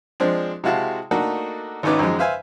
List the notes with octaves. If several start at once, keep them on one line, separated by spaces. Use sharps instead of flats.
F3 G#3 C4 D4
C3 G#3 E4 F#4 F5 A5
A3 A#3 D4 D#4 F#4 A4
G#1 D#3 C#4 D#4 B4 D6
F#2 D#3 F3 G#3
B4 C5 E5 F5 G#5